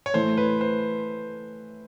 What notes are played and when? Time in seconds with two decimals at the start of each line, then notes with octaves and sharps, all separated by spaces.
0.06 C#5
0.14 A2 E3 A3 C5
0.37 B4
0.61 C5